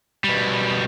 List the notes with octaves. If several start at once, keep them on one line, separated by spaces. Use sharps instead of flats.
B2 G3